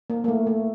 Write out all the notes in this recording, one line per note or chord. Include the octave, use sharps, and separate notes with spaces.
A#3
A#3
A3
A3